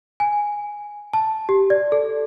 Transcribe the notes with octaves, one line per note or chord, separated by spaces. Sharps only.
G#5
A5
G4
D5
A4